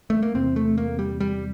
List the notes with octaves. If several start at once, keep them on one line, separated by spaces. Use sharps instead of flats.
A3
A#3
E2 C3 C4
A3
A#3
G3
G3